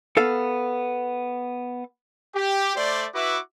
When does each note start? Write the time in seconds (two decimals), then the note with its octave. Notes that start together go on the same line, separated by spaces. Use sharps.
0.17 B3 A4 F5
2.35 G4
2.77 A3 C5 D5
3.15 E4 F#4 B4 E5 D6